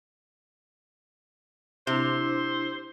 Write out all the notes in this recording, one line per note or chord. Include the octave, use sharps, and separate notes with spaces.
C3 D4 E4 C5